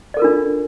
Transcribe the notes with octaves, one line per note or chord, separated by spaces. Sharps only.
D4 F4 A4 A#4 D5